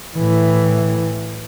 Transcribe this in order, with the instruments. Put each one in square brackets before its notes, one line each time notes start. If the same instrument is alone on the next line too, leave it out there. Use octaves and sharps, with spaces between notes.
[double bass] A2 E3